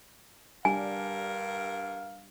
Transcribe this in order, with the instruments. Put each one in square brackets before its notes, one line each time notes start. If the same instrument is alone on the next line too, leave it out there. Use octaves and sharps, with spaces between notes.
[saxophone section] G2 A#4 [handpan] G3 D4 G4 [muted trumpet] F5 [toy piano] G#5